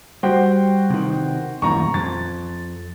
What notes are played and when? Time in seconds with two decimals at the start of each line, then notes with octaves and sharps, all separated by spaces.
0.23 G3 F#4 C5 G5
0.90 C3 D#3
1.62 D#1 A1 F#2 A#5 C#6
1.94 F2 A6